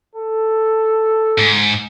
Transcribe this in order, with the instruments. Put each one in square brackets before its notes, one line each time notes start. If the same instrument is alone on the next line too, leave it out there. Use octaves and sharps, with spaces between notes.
[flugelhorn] A4
[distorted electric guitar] G#2